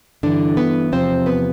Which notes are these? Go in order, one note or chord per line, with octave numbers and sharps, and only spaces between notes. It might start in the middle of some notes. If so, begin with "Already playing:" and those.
G2 D3 E3 D4
B3 B4
E2 C3 F3 C4 C5
B3 B4